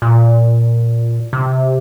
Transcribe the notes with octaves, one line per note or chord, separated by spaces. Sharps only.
A#2
C3